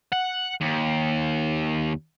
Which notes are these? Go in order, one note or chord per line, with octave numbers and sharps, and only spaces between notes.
F#5
D#2